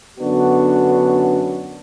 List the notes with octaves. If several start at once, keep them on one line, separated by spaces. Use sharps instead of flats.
F#2 D3 B3 D4 F#4